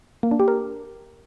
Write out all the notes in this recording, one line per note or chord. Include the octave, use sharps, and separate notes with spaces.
A#3
D4
G4
A#4